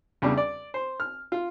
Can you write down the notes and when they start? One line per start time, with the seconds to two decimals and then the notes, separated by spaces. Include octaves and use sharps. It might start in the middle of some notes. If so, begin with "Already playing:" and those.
0.22 E2 C#3 G3 D4
0.38 D5
0.74 C5
1.00 F6
1.32 F4